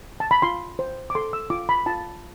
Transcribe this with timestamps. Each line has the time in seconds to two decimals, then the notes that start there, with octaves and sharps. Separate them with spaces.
0.20 A5
0.31 B5
0.42 F4 C6
0.79 C5
1.10 D6
1.15 A4 C6
1.33 E6
1.50 F4 D6
1.69 B5
1.86 F4 A5